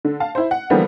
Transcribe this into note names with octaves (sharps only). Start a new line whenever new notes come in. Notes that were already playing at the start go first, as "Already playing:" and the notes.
D3
F5 A5
E4 C5
F#5
D3 E3 F3 G3 A#3 B3